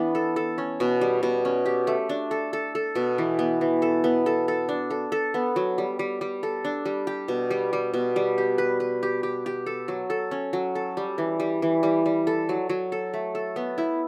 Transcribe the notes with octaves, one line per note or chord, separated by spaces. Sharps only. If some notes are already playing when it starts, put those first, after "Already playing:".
Already playing: E3 B3 D4
A4
A4
C#4
B2
G3
B2
C#4
G4
A3
D4
A4
A4
A4
B2
E3
B3
E3
A4
B3
A4
A4
D4
A4
A4
B3
F#3
G3
G3
G3
A4
D4
G3
G4
B2
G3
G3
B2
G3
G4
B4
B4
G4
G4
G4
A4
F#3
A4
C#4
F#3
A4
G3
E3
G3
E3
G3
G3
A4
F#3
F#3
A4
A3
A4
B3
E4